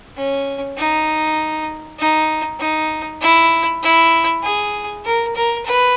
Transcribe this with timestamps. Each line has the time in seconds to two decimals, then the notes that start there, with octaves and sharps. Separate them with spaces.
0.16 C#4
0.78 D#4
1.99 D#4
2.60 D#4
3.21 E4
3.83 E4
4.43 G#4
5.05 A#4
5.35 A#4
5.65 B4